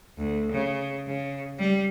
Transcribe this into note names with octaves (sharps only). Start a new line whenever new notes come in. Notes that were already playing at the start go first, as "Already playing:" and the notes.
D2
C#3
C#3
G3